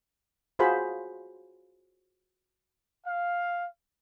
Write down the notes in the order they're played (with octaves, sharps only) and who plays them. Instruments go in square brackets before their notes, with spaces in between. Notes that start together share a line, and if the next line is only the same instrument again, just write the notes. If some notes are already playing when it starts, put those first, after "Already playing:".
[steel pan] F4 F#4 G#4 C5 F5 B5
[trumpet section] F5